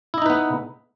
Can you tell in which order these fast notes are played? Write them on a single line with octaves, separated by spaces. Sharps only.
E4 D#5 D#4 B4 B3